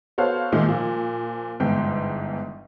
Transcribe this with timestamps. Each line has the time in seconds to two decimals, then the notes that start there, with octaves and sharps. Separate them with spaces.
0.18 B3 F#4 A4 C5 C#5 F5
0.52 A#2 D#3 G#3 A3
0.68 A#2 F3
1.60 G1 E2 G#2 G5